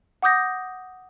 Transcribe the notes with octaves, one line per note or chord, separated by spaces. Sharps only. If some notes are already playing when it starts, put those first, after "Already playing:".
F#5 D6 D#6 G6 A#6